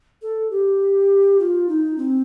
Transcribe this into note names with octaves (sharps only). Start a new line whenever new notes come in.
A4
G4
F4
D#4
C4